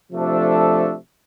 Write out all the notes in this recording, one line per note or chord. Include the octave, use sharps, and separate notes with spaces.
C3 F3 A3 D4 A4